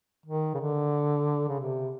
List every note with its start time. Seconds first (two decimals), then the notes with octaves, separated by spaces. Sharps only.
0.26 D#3
0.54 C#3
0.60 D3
1.49 C#3
1.60 C3